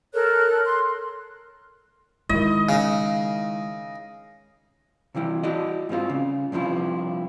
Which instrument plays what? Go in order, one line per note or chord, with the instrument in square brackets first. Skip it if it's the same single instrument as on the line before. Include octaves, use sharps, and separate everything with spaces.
[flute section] A4 A#4 C#5 F#6
C6 F#6
[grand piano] D#3 E4 [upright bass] G#3 [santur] D#5
[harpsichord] C#3
[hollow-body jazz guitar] C3 E3 G3 E4
E4 F#4 D5 D#5
G#2 G3 C4 F4
C#3
G2 C3 F3 E4 F4